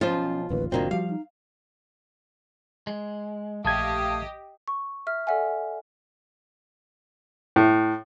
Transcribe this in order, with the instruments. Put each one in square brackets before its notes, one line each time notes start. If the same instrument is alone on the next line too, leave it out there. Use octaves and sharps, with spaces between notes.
[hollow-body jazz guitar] B1 F3 C5 [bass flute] C#4 [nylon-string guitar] F4
[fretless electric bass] D1 A1 D#2 [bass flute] B4
[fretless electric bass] F#1 A#2 D4 [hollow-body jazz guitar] D#3 A#3 C4 [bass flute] F#4
[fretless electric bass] F3 G3 [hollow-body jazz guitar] F5
[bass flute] D#4
[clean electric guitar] G#3
[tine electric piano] A#1 A5 G#6 [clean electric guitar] A3 [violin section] G4 D#5 [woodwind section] F5 D#6
[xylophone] C#6
E5 F6
A4 D5 E5 F#5 G#5
[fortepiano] A2